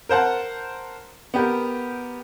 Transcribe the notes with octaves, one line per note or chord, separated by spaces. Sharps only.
A#4 C5 F#5 A5
B3 G4 A#4